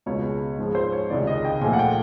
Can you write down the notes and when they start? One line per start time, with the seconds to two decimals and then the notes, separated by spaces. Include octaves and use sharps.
0.06 C#2 B2 G#3 C#5
0.59 G#2 F3 G#3
0.75 C5
0.92 C#5
1.10 C#2 C3 D#3 G#3 D5
1.27 D#5
1.45 G5
1.61 A#2 F3 A3 G#5
1.73 F#5
1.79 G5